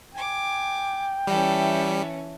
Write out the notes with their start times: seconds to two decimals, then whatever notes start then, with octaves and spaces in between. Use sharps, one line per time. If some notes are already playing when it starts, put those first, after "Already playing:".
0.15 G5 G#5 D6
1.27 E3 G3 C#4 A4 E5